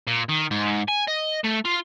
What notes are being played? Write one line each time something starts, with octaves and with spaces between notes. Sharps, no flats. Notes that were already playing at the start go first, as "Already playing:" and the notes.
A#2
D#3
G#2
G#5
D#5
A3
F4